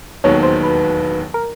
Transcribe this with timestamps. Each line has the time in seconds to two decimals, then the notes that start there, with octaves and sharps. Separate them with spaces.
0.24 E1 D#2 D#3 F#3 B3 C#5
0.43 C5
0.63 B4
1.34 A#4